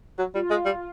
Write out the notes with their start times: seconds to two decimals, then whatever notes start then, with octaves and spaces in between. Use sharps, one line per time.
0.18 F#3 F#4
0.35 G3 F4
0.50 G#3
0.66 G3